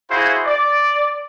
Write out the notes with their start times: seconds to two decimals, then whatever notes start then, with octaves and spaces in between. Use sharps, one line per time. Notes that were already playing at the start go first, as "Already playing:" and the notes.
0.10 E4 F#4 G#4 C5 F5
0.45 D5